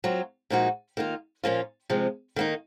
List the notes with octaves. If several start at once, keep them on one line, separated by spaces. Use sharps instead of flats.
F#3 C4 F4
A#2 F3 G#3 D#4 F#4
D#3 A#3 F4
A#2 F3 A#3 C#4 F4
C3 F3 G#3 C4
D#3 A#3 D#4